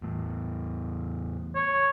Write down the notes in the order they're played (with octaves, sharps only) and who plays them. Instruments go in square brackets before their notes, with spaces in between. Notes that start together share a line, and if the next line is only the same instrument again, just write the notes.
[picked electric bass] E2 A2
[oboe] C#5